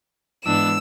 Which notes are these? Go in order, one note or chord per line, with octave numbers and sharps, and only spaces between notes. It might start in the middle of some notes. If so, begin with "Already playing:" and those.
G#2 E3 G#3 B3 D4 E6